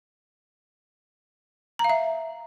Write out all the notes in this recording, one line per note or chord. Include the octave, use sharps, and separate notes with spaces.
A#5
F5
E5